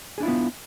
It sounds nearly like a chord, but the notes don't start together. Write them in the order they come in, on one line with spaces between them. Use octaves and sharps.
G#4 D4 E4 F4 B3